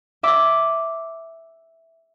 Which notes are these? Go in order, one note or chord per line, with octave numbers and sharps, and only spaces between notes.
E5 D6